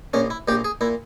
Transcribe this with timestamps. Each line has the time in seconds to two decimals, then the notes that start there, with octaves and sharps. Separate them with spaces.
0.13 A#1 A#2 C#4
0.30 E4
0.48 A#1 A#2 G4
0.64 G#4
0.81 A#2 E4